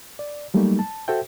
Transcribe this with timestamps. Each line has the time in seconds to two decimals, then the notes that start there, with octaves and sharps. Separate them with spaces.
0.19 D5
0.54 F#3 G3 A3 A#3 D#4
0.79 A5
1.08 F#4 A4 C5 E5 G5